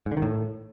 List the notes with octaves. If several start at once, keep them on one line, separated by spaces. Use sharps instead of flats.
G#2
D3
D#3
A2